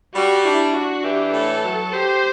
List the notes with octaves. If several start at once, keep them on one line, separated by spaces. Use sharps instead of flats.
G3 F#4
D4 E4
D4 F#4
E3 G4
A2 A4
F#3
G4 C5